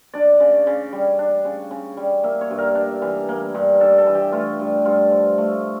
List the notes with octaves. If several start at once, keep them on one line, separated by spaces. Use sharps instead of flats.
D4 D5
C#3
C#3
G3
D4
C#3
C#3
G3
A#3 E5
C#5
G2
A#4
D4
E3
A#3
G2
D4 A4
A4
E3
G4
A3 F4
G2
G2 F4
F3
A3